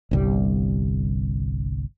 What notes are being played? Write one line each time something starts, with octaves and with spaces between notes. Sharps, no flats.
G1 C2 G3